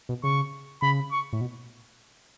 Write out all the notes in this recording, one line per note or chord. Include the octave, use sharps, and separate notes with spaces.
B2
C#3 C#6
C#3 B5
C#6
A2
B2